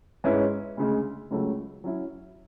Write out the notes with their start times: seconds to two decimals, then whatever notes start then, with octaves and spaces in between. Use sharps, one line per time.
0.24 G#2 G#3 C#4 E4 B4
0.77 D2 C#3 G#3
1.31 C#2 C#3 F#3 A3
1.84 F#3 C#4 E4